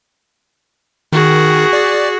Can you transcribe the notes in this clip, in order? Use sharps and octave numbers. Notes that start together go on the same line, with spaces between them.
D#3 F#4 G#4
D5